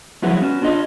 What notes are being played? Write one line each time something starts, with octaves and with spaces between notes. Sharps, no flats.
F3 F#3 E4 F#4 G#4 B4
B3 C#4 D#4 F#4
D4 F4 G#4 D#5